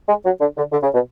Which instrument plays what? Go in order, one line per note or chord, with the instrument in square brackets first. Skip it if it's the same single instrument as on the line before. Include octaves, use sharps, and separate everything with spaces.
[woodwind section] G#3
F#3
D3
D3
D3
C#3
B2